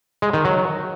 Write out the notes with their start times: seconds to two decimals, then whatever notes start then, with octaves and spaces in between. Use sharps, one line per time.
0.22 G#3
0.33 D#3
0.45 F#3